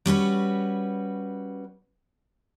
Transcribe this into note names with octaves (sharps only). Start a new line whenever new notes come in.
G3 C#4 F#4 B4